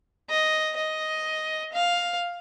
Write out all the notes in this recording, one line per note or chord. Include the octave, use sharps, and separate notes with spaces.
D#5
D#5
F5